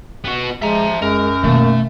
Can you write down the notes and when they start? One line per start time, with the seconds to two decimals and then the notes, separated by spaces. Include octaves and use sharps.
0.25 B3 F#4
0.62 F3 G#3 E5 A#5
1.02 F#2 G#3 A#4
1.44 B2 D#3 A3 A#3